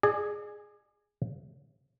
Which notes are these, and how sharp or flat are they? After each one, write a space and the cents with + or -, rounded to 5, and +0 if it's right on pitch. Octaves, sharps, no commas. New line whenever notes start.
G#4 +0 D5 +40